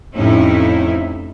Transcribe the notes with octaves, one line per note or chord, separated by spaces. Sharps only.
F2 A2 C3 C#4 D#4 E4